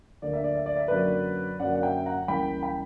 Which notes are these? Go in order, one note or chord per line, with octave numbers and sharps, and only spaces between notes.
D2 D3 A#3 D5
E5
D5
E5
D5
E5
F#2 D3 F#3 A#3 B4 D5
F#2 D3 F#3 A#3 D5 F#5
F#5
E5 G5
F#5 A#5
C#2 C#3 E3 G3 A#3 G5 B5
G5 B5